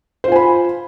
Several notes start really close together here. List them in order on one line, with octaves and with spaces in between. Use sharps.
C5 F4 G#5 B5